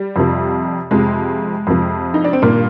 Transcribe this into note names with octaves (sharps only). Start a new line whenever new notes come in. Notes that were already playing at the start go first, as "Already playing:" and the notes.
Already playing: G3
F2 C3 F3
F2 C3 F3 G#3
F2 C3 F3
D#4
D4
C4
G2 A#2 D#3 A#3